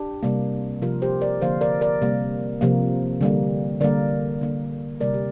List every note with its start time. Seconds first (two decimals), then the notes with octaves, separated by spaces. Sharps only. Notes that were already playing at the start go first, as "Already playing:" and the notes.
Already playing: D4 G4
0.23 C3 G3 A#3
0.82 C3 F3 A#3 F4 A#4
1.02 G4 C5
1.21 A#4 D5
1.41 D3 F3 A#3 C5 F5
1.61 A#4 D5
1.81 A#4 D5
2.02 C3 G3 A#3
2.61 C3 F3 A#3
3.21 D3 G3 A#3
3.80 D3 G3 A#3 A#4 D5
4.41 D3 A#3
5.00 C3 G3 A#3 A#4 D5
5.14 G4